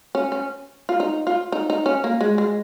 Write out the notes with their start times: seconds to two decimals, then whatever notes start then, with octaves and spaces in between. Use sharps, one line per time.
0.15 C#4
0.32 C#4
0.89 F4
1.00 D#4
1.27 F4
1.52 D#4
1.70 D#4
1.86 C#4
2.04 A#3
2.21 G#3
2.38 G#3